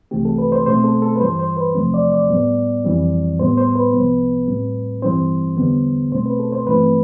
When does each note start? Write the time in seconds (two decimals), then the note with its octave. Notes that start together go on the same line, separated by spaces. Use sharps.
0.11 C2 C3 E3 A3 C4 G4
0.25 A4
0.38 B4
0.52 C5
0.66 B2 A3 C4 C5
0.84 A4
1.02 A4
1.16 B4
1.20 G2 E3 G3 C5
1.39 C5
1.57 B4
1.75 E2 C3 F3 A3 C4 C5
1.94 D5
2.12 D5
2.29 A2 G3 B3
2.85 F2 E3 G3 C4
3.40 A2 G3 B3 C5
3.57 C5
3.75 B4
3.93 C2 C3 F3 B3
4.48 A2 G3 C4
5.02 G2 E3 G3 C4 C5
5.57 E2 D3 G3 B3
6.12 B2 A3 C4 C5
6.26 B4
6.39 A4
6.52 C5
6.67 G2 E3 A3 C4 B4